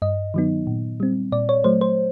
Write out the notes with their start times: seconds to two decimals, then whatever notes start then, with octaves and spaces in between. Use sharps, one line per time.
0.02 G2 D#5
0.34 D#3 F#3 B3 D#4
0.67 A#2
1.00 G3 C4
1.32 A#2 D5
1.49 C#5
1.64 F#3 A3 C5
1.81 C5